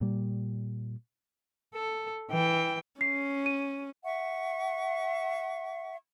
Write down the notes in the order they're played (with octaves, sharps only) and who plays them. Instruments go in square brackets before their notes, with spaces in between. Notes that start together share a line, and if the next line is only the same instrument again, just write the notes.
[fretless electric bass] A#2 G3
[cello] A4
E3 G5
[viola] C#4 [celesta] C7
[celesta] D#7
[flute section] E5 F#5 C#6